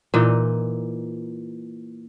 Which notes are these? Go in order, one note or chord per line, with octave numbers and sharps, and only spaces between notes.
A#2 E3 D#4